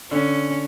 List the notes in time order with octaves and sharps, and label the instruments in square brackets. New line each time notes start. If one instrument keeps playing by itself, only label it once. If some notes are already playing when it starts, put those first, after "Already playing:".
[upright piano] D3 [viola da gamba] C#4